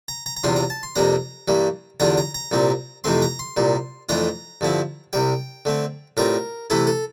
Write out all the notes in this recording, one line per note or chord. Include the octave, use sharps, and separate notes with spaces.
A#5
A#5
A#5
E2 C3 G3 D4 F4 C6
A#5
A5
C6
F2 C3 G3 A#3 D4 A#5
G2 E3 G3 A#3
E2 D3 G3 D4 F4 A#5
A#5
A#5
C2 A#2 G3 C4
F2 C3 E3 A3 C4 C6
A#5
C6
C2 A#2 G3
F2 E3 A3 D4 F4 A#5
G2 D3 F3 C4 E4
C2 C3 G3 G5
D3 A3 C4
A2 G3 C4 F4 A#4
C3 E3 A3 E4 A4
A4